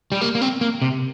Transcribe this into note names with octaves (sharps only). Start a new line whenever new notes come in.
G3
A#3
A#3
C4
A#3
C3